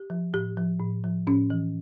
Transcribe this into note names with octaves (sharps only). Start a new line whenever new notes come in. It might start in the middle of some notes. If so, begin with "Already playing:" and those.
Already playing: G4
F3
A2 G4
F3
A2
F3
A2 C#4
E3